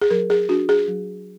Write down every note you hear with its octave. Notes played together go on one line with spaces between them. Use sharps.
G#4
F#3 A#4
G#4
D4 F#4
G#4
F#3